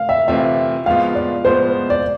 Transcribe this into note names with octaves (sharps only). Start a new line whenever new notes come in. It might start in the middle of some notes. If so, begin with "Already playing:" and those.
Already playing: F5
E5
C3 E3 A3 C4 F4 E5
A2 F3 G#3 B3 F4 F5
D5
A2 F3 G#3 B3 F4 C5
D5